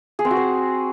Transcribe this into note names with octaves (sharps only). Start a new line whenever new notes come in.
G#4
C4
F#4
C5